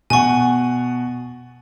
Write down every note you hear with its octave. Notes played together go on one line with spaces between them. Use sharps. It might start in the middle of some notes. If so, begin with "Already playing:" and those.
B2 F#5 G#5 C#6